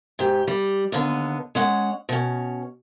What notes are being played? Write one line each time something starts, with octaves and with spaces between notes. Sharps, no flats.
G#2 G4
G3
D#2 D3 B3
G#3 C#4 F#5
B2 C#4